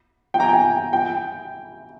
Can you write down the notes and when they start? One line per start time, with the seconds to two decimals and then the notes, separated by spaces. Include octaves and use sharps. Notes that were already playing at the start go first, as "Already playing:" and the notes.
0.34 G5
0.40 A#5
0.43 G#5
0.53 G5
0.93 G5